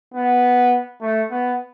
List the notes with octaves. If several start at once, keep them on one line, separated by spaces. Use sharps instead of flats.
B3
A3
B3